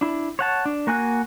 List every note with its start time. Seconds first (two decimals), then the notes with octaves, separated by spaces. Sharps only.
0.01 D4 E4
0.39 C#5 F#5 A5
0.65 D4
0.87 A#3 F#4 G#5 F#6